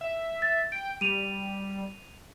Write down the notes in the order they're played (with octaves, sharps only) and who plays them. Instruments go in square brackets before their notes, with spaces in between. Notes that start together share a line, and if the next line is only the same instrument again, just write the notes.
[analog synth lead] E5
[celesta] A6
[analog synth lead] G5 [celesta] D7
[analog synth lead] G3 [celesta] D#7 F7